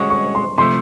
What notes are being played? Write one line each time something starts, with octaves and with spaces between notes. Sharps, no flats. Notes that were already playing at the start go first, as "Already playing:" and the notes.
Already playing: G#3 C#4 F#4 C#6
C#6
C6
C3 F3 A3 C6